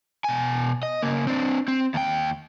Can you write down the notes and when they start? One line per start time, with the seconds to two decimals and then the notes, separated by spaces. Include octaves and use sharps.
0.24 B2 G#5
0.83 D#5
1.02 C#3 A#3
1.27 C4 D4
1.68 C4
1.94 D#2 G5